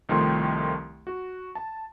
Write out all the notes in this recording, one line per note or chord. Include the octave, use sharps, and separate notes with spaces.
C2 D#3 F3 A3 G5 C6
F#4
A5